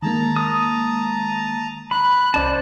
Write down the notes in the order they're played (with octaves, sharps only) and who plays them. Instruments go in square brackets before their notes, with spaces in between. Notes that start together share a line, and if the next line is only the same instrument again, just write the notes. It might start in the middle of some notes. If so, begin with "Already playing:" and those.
[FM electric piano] D#3 G#3 A#3 [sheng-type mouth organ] A5 A#5
[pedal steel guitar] D#6
[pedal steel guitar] B5 [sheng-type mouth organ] F#6
[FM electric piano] C2 C#4 [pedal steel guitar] C5 D5 A5